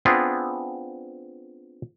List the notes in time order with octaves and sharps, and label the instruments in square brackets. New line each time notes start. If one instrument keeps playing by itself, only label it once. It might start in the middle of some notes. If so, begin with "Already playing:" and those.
[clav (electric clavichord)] B3 C4 D4 F4 G#4